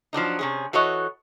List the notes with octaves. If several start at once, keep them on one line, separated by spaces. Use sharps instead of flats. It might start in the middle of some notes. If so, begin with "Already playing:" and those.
F3 F#3 D4 D#4
C3 C#4 G#4
E3 F#4 A4 C#5 D#5